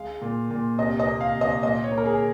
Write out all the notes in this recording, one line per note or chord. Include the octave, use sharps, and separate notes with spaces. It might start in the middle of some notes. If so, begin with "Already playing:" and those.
Already playing: G#3 F5
A#2
A#2
C3 D#5
D#5
A#3
F5
C3
D#5
A#2 D#5
C#5
A#3
A#4
G#4